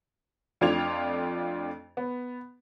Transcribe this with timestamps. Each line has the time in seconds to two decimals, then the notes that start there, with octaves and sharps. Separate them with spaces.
0.61 F2 A3 D4 F4 G#6 F7
1.97 B3